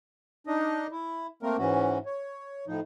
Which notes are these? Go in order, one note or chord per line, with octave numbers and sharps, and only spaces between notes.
D4 D#4 D#5
E4
A3 A#3 C4 A#4
G#2 E3 C#4 F#4
C#5
A2 F3 D#4